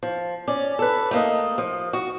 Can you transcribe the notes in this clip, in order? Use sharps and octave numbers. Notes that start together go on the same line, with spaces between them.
F3
C#4 D5
A4 B4
A3 A#3 D#5
F3
F#4